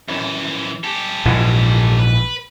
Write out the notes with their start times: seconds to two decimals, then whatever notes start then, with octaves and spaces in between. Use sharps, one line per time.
0.08 F#2 E3
0.84 G4 A4
1.25 A#1 G#2 E3
1.99 B4